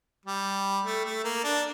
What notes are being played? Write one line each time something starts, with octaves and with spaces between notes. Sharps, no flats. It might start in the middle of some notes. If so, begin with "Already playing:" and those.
G3
A3
A3
A#3
D4